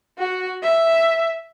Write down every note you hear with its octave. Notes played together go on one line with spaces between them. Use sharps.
F#4
E5